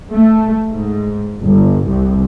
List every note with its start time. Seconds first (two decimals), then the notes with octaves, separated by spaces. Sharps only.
0.12 A3
0.70 G#2
1.43 G1
1.88 C2